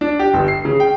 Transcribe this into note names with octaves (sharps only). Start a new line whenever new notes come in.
D4
G4
G1
C7
C#3
G5